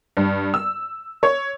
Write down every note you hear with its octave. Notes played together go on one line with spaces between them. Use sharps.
G2
E6
C#5